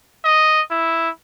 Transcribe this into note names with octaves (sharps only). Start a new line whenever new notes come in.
D#5
E4